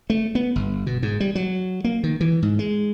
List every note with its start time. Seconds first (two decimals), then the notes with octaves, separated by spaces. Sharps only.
0.10 A3
0.35 B3
0.56 G1
0.87 B2
1.03 G#2
1.20 G3
1.35 F#3
1.84 A#3
2.04 D#3
2.21 E3
2.42 G#2
2.59 G#3